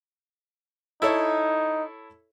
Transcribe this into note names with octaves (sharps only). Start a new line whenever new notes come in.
D#4 E4 A4 C#5